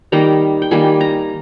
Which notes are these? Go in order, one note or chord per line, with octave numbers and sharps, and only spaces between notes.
D#3 G3 A#3 A#5
G5
D#3 G3 A#3 G#5
A#5